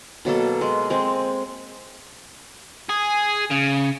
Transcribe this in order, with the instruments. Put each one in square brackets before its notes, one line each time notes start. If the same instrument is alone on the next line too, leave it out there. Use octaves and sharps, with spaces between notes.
[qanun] B2 F#3 A#3 A4
G#3
G#3 C4
[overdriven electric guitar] G#4
C#3